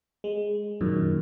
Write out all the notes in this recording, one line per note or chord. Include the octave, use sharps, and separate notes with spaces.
G#3
F#2 A#2 D#3